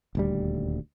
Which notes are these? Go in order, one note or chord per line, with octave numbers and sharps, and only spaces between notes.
D#1 D2 G3